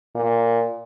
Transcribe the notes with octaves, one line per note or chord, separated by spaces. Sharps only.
A#2